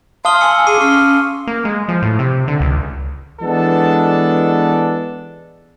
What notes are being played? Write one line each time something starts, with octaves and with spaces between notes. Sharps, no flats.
F5 A5 C6 D#6 F6 G7
G#5 C6 E6 C#7
G#4 D6 C7 D#7
C#4 C#6 F6
A#3
G#3
F3
A2
C3
D3
C#2
E3 G#3 B3 D4 A4 A5